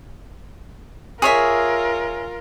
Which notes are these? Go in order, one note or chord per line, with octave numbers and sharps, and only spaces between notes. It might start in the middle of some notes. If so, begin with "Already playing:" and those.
F4 G#4 A#4 C#5 E5